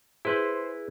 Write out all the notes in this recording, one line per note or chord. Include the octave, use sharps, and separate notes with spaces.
E4 G#4 B4 C5